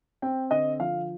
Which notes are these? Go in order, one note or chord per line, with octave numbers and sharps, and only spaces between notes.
C4 G5
D3 D#5
F3 F5